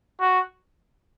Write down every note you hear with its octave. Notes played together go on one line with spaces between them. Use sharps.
F#4